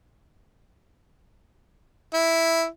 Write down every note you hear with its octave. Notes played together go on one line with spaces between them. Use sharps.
E4